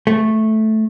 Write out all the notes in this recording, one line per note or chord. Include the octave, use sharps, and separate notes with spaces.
A3